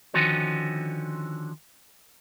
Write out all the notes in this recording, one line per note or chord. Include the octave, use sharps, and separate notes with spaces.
D3 D#3 F3 C#4 F#4 C5